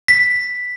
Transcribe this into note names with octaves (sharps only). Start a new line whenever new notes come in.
B6